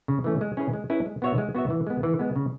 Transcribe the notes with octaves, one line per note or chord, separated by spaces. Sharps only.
C#3
E3 A3 C#4
G#3
C#4 E4 G#4 B4
G#3
C#4 E4 G#4 B4
G#3
B3 F#4 C#5 E5
G#3
B3 F#4 C#5 E5
E3
G#3 B3
E3
G#3 B3
C#3